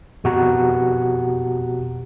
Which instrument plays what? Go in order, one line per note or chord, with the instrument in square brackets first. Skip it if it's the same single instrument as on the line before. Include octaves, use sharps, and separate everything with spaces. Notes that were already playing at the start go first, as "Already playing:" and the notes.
[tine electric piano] F2 B2 F#4 G4 F#5 A#5